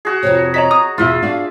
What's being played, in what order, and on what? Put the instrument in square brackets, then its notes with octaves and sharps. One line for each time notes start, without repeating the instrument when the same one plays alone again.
[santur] F#4 G#4
[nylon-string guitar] F2 C3 [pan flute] C#5
[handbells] C#5 D#5 B6 [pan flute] A#5
[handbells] D#6
[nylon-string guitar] E2 B2 [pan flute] E4 [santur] F4 E5
[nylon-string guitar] D4 F#4 [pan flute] F5